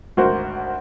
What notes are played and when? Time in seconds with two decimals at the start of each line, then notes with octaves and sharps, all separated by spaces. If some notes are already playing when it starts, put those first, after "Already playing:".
0.17 G#1 D2 F#4 A#4 C5